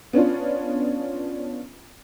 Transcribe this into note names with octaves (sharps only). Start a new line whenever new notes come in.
B3 C#4 D4 F4